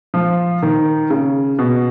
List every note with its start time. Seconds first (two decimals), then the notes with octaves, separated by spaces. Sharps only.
0.14 F3
0.63 D#3
1.10 C#3
1.59 B2